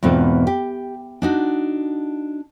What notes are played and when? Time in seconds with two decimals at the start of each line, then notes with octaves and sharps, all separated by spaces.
0.03 E2 G#2 B2 C4 F4 A4
0.47 G4
1.22 D4 D#4 F#4